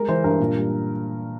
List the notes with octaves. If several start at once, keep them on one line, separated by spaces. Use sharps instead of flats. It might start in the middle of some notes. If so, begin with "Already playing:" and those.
Already playing: G#3 A#4
E3 C5
G2 A#4
A#2
G3